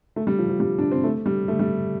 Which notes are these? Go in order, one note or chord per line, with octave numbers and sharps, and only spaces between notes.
A3
G3
F3
F3
G3
D4
C4
A3
G3
A3
G3